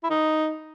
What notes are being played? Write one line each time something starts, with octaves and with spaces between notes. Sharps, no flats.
E4
D#4